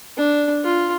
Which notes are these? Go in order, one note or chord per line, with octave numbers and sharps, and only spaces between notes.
D4
F4